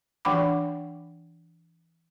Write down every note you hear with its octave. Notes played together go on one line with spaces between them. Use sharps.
E3 D4 F#5 G5 B5 D6